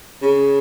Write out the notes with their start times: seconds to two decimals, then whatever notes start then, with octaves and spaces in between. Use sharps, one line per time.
0.22 C#3